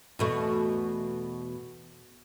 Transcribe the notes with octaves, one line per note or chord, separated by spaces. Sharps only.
E2 B2 A3